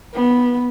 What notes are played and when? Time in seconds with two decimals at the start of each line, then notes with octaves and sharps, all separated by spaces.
0.14 B3